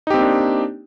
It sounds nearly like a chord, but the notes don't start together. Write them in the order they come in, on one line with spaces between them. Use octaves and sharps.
D#4 G4 C4 A#3 D4